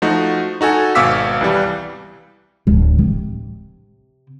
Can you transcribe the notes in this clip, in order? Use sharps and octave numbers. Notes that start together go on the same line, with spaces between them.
F3 A3 D#4 F#4
D#4 F#4 A4 G#5
G#1 B2 F5 D6 E6 B6
C2 E3 G3
D1
C3